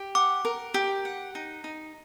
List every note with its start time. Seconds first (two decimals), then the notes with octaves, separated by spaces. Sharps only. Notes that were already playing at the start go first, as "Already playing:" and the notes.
Already playing: G4
0.15 F#5 D6
0.45 A#4
0.74 G4
1.05 F#5
1.35 D#4
1.64 D#4